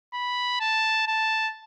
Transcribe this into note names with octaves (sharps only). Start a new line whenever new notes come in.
B5
A5
A5